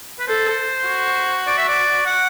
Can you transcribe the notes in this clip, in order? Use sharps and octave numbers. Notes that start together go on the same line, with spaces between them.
B4
A4 C5
F#4
D5
E5
D5
F#5